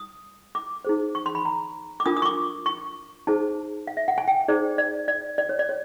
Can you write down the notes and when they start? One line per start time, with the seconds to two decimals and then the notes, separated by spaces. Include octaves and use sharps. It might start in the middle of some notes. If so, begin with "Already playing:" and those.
Already playing: D#6
0.55 D6
0.85 D#4 G#4 C5
1.15 C#6
1.26 C6
1.35 B5
1.45 A#5
2.00 D6
2.06 D4 F4 A#4 D#6
2.17 D#6
2.22 C#6
2.25 D6
2.66 C#6
3.27 D#4 G#4 C5 A5
3.87 F5
3.97 E5
4.08 F#5
4.18 G#5
4.28 G5
4.48 D#4 G#4 C5 D5
4.78 D5
5.08 D5
5.38 D5
5.49 C#5
5.59 D5
5.69 C#5